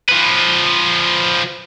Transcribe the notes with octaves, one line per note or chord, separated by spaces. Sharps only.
F3 B4